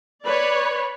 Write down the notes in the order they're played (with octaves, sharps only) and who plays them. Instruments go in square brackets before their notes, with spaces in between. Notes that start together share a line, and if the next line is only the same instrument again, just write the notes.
[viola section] B4 C#5 D5 B5